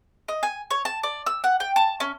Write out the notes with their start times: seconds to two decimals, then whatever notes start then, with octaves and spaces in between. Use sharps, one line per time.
0.28 D#5
0.43 G#5
0.71 C#5
0.85 A5
1.03 D5
1.26 E6
1.44 F#5
1.60 G5
1.76 A5
2.00 C#4